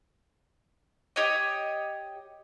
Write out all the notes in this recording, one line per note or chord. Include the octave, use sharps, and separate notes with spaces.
G4 C#5 D#5